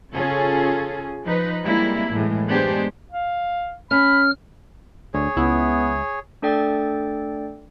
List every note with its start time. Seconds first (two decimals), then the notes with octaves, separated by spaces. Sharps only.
0.12 C#3 C#4 F4 G#4 A4
1.25 F3 D#4 B4
1.64 G3 G#3 A#3 C4 E4
2.11 F#2 A2 E3 G#3
2.47 G#3 B3 D4 G4 G#4 C5
3.11 F5
3.91 C#4 B5 F6
5.14 D2 G#4 C#5
5.36 C#2 B3 E4
6.42 A3 D4 A4 D5 G5 A6